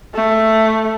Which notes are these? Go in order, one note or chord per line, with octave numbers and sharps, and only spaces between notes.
A3